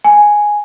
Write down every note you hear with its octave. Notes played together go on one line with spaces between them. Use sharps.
G#5